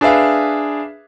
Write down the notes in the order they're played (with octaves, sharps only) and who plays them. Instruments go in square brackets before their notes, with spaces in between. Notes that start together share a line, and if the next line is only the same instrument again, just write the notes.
[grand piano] D4 G#4 B4 E5 F5